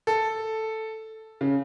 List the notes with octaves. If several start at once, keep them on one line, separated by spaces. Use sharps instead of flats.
A4
C#3